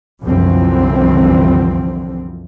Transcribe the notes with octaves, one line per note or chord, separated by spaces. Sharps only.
C2 F#2 D3 E3 F3 C4